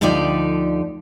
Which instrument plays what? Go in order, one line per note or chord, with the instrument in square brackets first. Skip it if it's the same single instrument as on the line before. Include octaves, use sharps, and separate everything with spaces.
[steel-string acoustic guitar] D2 D3 F3 D#4 G4 D5